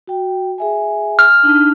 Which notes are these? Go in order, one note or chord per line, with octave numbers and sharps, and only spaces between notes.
F#4 G5
G#4 E5 G#5
F6
D4 D#4 A5